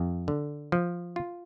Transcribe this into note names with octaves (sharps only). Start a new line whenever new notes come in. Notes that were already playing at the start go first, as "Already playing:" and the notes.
Already playing: F2
D3
F3
F4